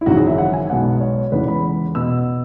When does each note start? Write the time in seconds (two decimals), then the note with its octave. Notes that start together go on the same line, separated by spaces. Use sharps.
0.01 E4
0.06 G#1 F#2 C#3 E3 F#4
0.16 G#4
0.27 E5
0.38 F#5
0.53 G#5
0.69 B1 B2 G#3 B3 F#5
1.00 C#5
1.32 E2 C#3 E3 G#3 B4
1.48 B5
1.95 B2 B3 E6